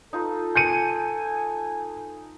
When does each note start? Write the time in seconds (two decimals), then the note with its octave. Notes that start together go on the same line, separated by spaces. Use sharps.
0.13 D#4 F4 A4 B4
0.55 G#5 G6 C#7 D#7